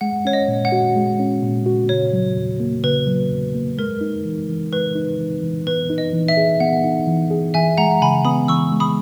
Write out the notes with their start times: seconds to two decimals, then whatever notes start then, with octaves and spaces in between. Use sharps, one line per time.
0.01 G#3 F#5
0.25 C#4 C#5
0.33 D#5
0.48 A#2
0.65 F#5
0.72 F#4
0.96 G#3
1.20 C#4
1.43 A#2
1.66 F#4
1.89 C#3 C#5
2.13 F#3
2.37 E2
2.60 A#3
2.84 C#3 B4
3.07 F#3
3.31 E2
3.55 A#3
3.78 G#3 A#4
4.01 D#4
4.25 E3
4.48 E3
4.72 G#3 B4
4.95 D#4
5.19 E3
5.42 E3
5.66 B3 B4
5.90 D#4
5.98 D#5
6.13 E3
6.28 E5
6.37 G#4
6.60 B3 F#5
6.84 D#4
7.08 E3
7.31 G#4
7.54 E3 E5 G#5
7.77 G#3 F#5 A#5
8.02 C#3 G#5 B5
8.25 B3 B5 D#6
8.48 E3 C#6 E6
8.72 G#3
8.80 B5 D#6